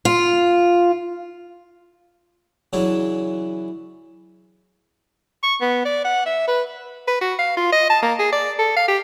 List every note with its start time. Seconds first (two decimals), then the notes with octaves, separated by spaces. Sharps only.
0.05 F4
2.73 C#3 E3 F#3 C#4 D4 E4
5.43 C#6
5.61 B3
5.85 D5
6.05 F#5
6.26 E5
6.47 B4
7.07 B4
7.21 F#4
7.38 F5
7.57 F4
7.72 D#5
7.90 A5
8.02 A#3
8.19 G#4
8.32 D5
8.59 A4
8.76 F5
8.88 G4